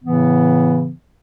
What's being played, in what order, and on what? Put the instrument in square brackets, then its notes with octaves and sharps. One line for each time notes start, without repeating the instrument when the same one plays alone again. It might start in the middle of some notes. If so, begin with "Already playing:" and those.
[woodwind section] A2 C#3 E3 B3